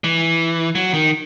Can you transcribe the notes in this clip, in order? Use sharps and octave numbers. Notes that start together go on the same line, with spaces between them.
E3
F#3
D#3